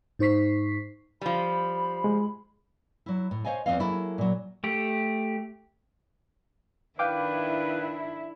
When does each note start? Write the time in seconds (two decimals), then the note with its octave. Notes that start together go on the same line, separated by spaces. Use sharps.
0.19 G#2 D#4 C5 C#6 B6 C7
1.21 F3 G3 B5
2.04 G#3
3.06 F#3 E4
3.31 A2
3.44 C5 C#5 D#5 F5 G#5
3.66 E2 E3 F3 C4 D#5 F5
3.79 F#3 A#3 E4 G#4 A4
4.18 A#2 F#3
4.64 A3 G4
6.99 D#3 D4 E4 B4 F5 G5 D6